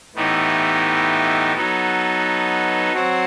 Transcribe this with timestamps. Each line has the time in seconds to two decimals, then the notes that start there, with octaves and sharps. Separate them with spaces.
0.15 A2 E3 B3 D#4 G4
1.54 F#3 B3 D#4 A4
2.93 F#3 C4 F#4 C5